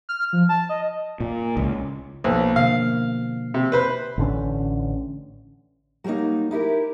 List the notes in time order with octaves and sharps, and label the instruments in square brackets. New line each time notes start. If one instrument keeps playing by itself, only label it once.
[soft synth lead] F6
F3
A5
D#5
[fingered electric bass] A#2
C#2
[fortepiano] B1 [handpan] F3 A#3 C5
[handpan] B2 D3 A#3 [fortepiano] F5
[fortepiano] C3
B4 C5 B5
[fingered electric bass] A1 D3 C#4
[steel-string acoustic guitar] F#3 G3 A3 A#3 D#4
D#4 E4 G4 A#4